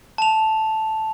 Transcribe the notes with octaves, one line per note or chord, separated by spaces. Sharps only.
A5 F7